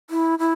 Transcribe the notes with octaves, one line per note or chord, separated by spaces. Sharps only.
E4
E4